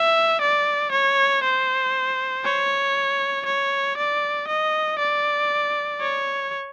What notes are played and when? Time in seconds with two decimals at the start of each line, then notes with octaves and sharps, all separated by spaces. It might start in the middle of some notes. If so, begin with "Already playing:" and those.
Already playing: E5
0.41 D5
0.92 C#5
1.43 C5
2.45 C#5
3.46 C#5
3.98 D5
4.48 D#5
4.99 D5
6.01 C#5